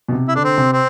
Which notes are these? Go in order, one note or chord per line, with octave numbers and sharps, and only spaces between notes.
B2
C3
E4
D3 D4
C4
C3
C4